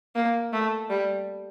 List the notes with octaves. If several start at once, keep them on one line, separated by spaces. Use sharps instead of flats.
A#3
A3
G3